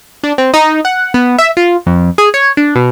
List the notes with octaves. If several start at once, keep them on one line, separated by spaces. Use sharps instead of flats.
D4
C4
D#4
F#5
B3
E5
F4
F2
G#4
C#5
D4
B2